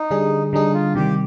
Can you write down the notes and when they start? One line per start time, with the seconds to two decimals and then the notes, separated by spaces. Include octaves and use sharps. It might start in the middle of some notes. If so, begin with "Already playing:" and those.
Already playing: D#4
0.11 D3 G3 D4 G#4
0.53 D3 G3 D4 D#4 G#4
0.74 F4
0.95 C3 D#3 G3 G4